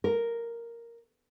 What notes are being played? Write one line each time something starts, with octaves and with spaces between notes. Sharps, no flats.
A#4